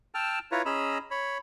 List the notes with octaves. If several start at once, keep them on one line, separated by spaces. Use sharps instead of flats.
G5 A5 E6 F6
E4 F4 B4 C#5 A#5
C#4 G#4 D#5 A#5 B5 E6
C#5 B5